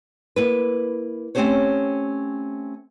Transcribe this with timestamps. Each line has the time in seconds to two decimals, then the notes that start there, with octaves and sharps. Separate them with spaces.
0.36 A#3 E4 B4
1.35 A3 C4 C#4 G4 C5 C#5